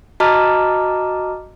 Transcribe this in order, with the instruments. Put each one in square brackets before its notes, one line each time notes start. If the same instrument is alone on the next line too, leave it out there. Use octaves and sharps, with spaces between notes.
[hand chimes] F#4 D#5 A5 A#5 D6 F6